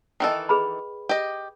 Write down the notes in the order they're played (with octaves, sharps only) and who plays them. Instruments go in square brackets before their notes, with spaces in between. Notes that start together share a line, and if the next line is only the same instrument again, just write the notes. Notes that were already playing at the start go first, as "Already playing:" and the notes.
[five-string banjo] D#3 E3 A4 [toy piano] D#5 G5
[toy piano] G#4 B4 B5
[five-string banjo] G4 D#5